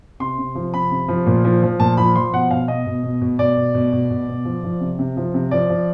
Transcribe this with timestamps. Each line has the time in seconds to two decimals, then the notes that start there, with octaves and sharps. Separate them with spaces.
0.20 C3 C6
0.38 C3
0.55 F3
0.74 C3 B5
0.91 C3
1.08 F3
1.26 A#2
1.44 F3
1.62 F3
1.79 A#2 A5
1.97 F3 B5
2.15 F3 C6
2.33 B2 F#5
2.51 B2 F5
2.68 B2 D#5
2.86 B2
3.03 B2
3.21 B2
3.39 B2 D5
3.57 B2
3.75 B2
3.92 B2
4.11 B2
4.29 B2
4.45 F3
4.64 F3
4.81 C3
4.99 C3
5.17 F3
5.34 C3
5.51 F3 D5
5.70 F3